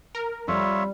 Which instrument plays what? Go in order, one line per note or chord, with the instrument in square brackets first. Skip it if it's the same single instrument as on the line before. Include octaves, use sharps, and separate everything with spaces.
[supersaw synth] A#4
[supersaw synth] F2 [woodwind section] G3 [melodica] F4 C#5 E5